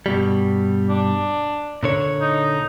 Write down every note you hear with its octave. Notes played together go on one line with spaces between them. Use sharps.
G2 B2 G3
D4
A#2 D3 C#5
D#4